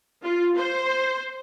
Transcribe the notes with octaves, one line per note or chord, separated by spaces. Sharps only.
F4
C5